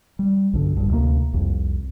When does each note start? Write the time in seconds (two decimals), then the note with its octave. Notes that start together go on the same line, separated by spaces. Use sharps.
0.19 G3
0.53 B1 G2 D3
0.77 B1 G2
0.89 D2 C3 D#3 A#3
1.34 C2 F2